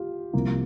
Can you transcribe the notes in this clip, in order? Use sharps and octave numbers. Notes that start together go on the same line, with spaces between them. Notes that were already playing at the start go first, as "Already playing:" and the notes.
Already playing: F4 G4
C2 C3 F3 A#3